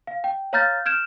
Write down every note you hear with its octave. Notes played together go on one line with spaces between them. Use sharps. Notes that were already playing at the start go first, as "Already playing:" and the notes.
F5
G5
C#5 F5 A#5 F6 G6 A6
F6 G6 G#6 D7 E7